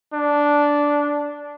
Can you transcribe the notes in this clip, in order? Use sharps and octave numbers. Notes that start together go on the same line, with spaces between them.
D4